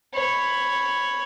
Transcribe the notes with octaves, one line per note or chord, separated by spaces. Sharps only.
C#5 B5